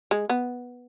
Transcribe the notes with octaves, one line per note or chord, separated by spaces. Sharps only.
G#3
B3